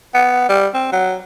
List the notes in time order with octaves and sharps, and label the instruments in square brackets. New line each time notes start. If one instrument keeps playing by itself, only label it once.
[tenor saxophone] B3
G3
C4
F#3